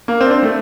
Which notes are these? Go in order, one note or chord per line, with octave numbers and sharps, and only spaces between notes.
A#3
C4
D4
C4
A3